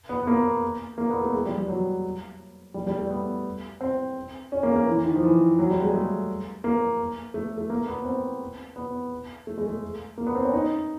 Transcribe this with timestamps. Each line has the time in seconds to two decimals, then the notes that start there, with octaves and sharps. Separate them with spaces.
0.09 B3
0.23 B3
0.27 A#3
0.98 A#3
1.10 B3
1.21 A3
1.33 G#3
1.46 G3
1.57 G3
1.68 F#3
2.74 G3
2.87 G3
2.99 A3
3.10 B3
3.81 C4
4.52 C#4
4.63 A#3
4.71 A3
4.76 A#3
4.87 E3
5.05 D#3
5.16 F3
5.23 E3
5.59 F#3
5.70 G3
5.82 G#3
5.94 A3
6.64 A#3
7.34 A3
7.58 A3
7.70 A#3
7.87 B3
8.05 C4
8.76 B3
9.47 A3
9.57 G#3
9.66 A3
10.18 A#3
10.27 B3
10.35 C4
10.44 C#4
10.53 D#4